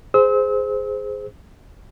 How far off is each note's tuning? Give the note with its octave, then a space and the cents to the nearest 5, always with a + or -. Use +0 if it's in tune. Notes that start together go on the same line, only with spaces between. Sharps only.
G#4 +0 C5 -10 E6 -40